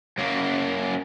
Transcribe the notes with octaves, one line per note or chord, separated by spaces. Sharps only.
F#2 A#3